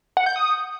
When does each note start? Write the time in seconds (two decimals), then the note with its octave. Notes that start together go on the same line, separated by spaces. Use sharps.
0.17 F#5
0.26 G6
0.36 D#6